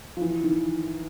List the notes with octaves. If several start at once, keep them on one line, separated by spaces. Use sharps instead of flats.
F3
E3
D#3